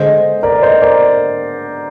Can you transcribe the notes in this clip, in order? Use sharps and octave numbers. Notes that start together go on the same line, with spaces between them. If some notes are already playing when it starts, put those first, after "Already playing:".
Already playing: D3 G#3 D4 C5 D#5
A#4 D5
C5 D#5
A#4 D5